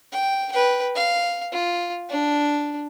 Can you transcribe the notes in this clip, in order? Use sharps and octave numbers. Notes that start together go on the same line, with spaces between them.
G5
B4 G5
F5
F4
D4